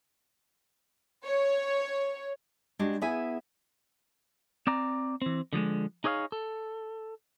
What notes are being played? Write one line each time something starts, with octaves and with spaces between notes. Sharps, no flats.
C#5
G#3 D4 F#4 G4
B3 E4 G#4 E5 G#5
C4 D5 A#5
E3 C4
D3 F3 F#3 G#3
D#4 G#4 C#5 D#5 F5
A4